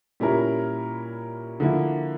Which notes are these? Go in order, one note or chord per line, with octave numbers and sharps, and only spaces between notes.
A#2 G3 C#4 E4 A#4
D3 F3 A#3 E4